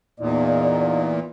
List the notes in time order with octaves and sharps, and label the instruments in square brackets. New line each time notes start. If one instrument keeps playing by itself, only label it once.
[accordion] E2 A#2 [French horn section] D#4 D5